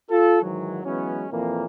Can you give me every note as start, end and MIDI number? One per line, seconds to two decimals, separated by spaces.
0.11 0.42 65
0.11 0.42 69
0.42 0.80 44
0.42 0.80 51
0.42 0.80 52
0.42 0.80 54
0.85 1.26 52
0.85 1.26 54
0.85 1.26 56
0.85 1.26 59
0.85 1.26 61
1.31 1.64 41
1.31 1.64 46
1.31 1.64 52
1.31 1.64 58